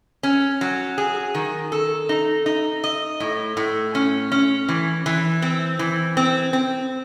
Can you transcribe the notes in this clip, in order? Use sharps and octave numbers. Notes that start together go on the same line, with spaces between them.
C#4
F#3
G#4
D#3
A4
D#4
D#4
D#5
A2
A2
C#4
C#4
E3
E3
C4
E3
C4
C4